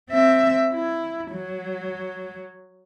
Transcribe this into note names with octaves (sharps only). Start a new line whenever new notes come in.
C4 E5
E4
F#3